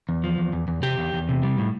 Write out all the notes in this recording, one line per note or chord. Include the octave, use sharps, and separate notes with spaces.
E2
F3
E2
E2
E2
C3 G4
E2
E2
C3
G3
A2